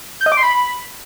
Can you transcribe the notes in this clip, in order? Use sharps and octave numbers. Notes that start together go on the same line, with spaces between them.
G6
D#5
D6
C6
B5